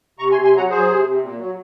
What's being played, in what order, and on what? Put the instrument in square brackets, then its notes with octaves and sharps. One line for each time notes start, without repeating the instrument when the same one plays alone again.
[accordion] C3 A#5 C#6
G#5 C6
C3
G#5 C6
F#3 F#5 A#5
F#3 G#4 C5
C3
C3
A#2
F#3